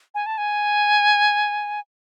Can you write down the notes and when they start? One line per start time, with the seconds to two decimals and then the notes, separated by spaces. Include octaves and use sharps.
0.15 G#5
0.26 A5
0.38 G#5